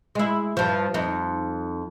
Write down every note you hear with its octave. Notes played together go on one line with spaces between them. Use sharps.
G#3 E4
G2 F3
F2 D#4